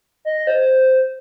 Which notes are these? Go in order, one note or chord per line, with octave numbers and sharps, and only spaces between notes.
D#5
C5